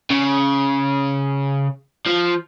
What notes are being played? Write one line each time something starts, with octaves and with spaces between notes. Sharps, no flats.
C#3
F3